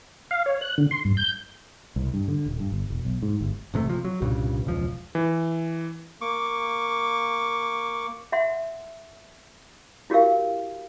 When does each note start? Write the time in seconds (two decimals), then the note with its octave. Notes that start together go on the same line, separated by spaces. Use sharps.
0.31 F5
0.46 C#5
0.61 F#6
0.78 D3
0.91 C6
1.05 G2
1.17 G6
1.96 C2
2.14 G2
2.28 D3
2.46 D#1
2.60 G2
2.72 G1
2.90 E1
3.05 B1
3.22 G#2
3.41 G1
3.74 A1 C3 G3 A3
3.89 C3 F3
4.05 F#3
4.22 C2 G2 A#2 C#3
4.65 E1 C#2 F3
5.15 E3
6.21 A#3 C#6 D6
8.32 E5 F#5 C6
10.10 E4 F#4 G4 A#4 F5